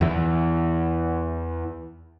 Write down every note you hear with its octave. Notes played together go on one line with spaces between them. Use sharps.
E2 E3